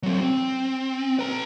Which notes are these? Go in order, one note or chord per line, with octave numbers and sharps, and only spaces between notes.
F#3 C4
C4
B4 A#5